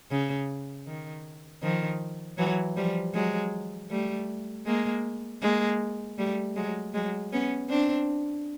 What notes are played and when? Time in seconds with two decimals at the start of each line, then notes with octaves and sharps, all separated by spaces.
0.11 C#3
0.87 D#3
1.63 D#3 F3
2.38 E3 F#3
2.77 F3 G3
3.14 F#3 G#3
3.91 G3 A3
4.66 G#3 A#3
5.42 G#3 A#3
6.18 G3 A3
6.56 F#3 G#3
6.94 F#3 G#3
7.33 B3 C#4
7.70 C4 D4